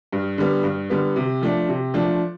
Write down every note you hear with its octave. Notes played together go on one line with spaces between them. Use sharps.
G2
D3 G3 B3
G2
D3 G3 B3
C3
F3 A3 D4
C3
F3 A3 D4